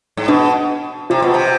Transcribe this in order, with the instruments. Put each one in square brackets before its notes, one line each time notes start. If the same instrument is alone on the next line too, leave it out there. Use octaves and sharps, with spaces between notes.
[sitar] G#2
[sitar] B2 [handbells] D4
[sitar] C3 [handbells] F4
[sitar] B2
C3